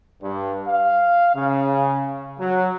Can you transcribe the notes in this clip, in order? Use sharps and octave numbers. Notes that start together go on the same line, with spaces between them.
G2
F5
C#3
F#3